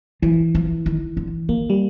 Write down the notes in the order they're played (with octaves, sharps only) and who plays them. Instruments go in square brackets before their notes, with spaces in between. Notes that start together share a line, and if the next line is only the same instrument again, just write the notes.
[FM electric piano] E3 [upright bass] F3
[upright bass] F3
D#3
D3
[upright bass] D#3 [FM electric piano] A#3
[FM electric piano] G3